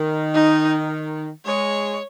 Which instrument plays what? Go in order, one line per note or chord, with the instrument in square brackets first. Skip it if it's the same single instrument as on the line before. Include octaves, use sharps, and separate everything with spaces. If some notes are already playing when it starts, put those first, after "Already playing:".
Already playing: [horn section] D#3
[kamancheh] D#4
[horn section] G#3 [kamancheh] C#5